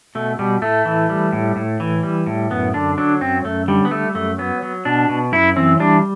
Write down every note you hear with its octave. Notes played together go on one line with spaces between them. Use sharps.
B2 A3
B2 G3
A2 A3
E3
G3
A2
A2
E3
G3
A2
F#2 B3
D3 D4
F#3 D4
F#2 C4
F#2 A3
D3 G3
B3
G3 A3
F#2 A3
F#3 B3
F#3
B2 D4
B2
F#2 E4
E3 C4
G3 D4